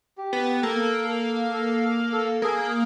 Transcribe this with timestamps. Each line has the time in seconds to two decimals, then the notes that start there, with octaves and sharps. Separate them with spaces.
0.18 G4
0.33 B3
0.63 A#3 A4
1.08 A4
1.53 A4
2.12 A4
2.42 A#3 G#4